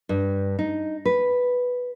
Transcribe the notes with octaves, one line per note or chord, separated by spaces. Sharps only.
G2
D#4
B4